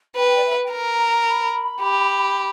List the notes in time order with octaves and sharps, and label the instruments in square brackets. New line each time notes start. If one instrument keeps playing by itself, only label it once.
[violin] B4 [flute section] G5
[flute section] D5
E5
F#5
G5
[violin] A#4 [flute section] A#5
[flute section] A#5
B5
[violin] G4